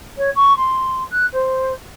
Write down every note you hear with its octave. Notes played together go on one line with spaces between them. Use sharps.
C#5
C#6
C6
F#6
C5